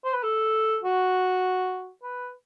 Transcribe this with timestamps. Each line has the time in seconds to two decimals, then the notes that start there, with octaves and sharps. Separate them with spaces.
0.05 C5
0.14 B4
0.23 A4
0.83 F#4
2.03 B4